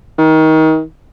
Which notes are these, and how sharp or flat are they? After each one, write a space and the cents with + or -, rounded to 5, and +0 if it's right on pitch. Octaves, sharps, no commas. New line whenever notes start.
D#3 +25